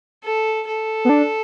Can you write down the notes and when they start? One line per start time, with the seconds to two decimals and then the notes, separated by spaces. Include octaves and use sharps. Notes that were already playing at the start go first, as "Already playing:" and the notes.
0.24 A4
0.67 A4
1.05 B3
1.09 D4